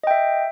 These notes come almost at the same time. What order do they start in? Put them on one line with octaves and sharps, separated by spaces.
D#5 G5 E5